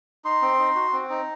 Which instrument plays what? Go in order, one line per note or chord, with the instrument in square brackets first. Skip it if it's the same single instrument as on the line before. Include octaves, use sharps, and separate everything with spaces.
[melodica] D#4 C6
C4
D#4
F#4
C4
D#4